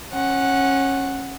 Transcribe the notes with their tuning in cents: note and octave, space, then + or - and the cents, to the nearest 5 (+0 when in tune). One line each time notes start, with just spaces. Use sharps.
C#4 -20 F#5 +0